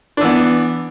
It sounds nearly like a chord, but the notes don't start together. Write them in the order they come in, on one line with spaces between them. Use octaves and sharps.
D4 E3 B3